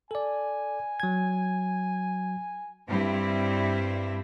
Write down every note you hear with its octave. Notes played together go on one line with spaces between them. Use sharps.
A4 D5 G#5
F#3 G#6
G2 G3 C4 E4